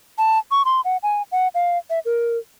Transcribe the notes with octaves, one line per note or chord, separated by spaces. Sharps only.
A5
C#6
C6
F#5
G#5
F#5
F5
E5
A#4